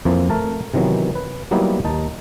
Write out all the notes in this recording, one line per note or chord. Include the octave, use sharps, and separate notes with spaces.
F2 E3 F3 A#3
A3 A#4 A5
C3 D#3 E3 F#3 B3
B4
F#3 G3 A#3 B3 D#4 E4
D#2 D#4 A5